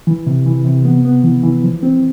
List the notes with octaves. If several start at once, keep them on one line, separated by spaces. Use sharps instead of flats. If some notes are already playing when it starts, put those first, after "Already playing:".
E3
C3
E3
C3
B3
B3
E3
E3
F3
C4